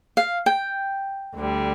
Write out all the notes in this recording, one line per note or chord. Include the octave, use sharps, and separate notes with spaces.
F5
G5
D2 D3 G3